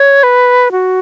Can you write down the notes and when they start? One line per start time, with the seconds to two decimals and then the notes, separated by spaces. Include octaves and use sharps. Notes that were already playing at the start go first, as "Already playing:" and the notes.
Already playing: C#5
0.23 B4
0.72 F#4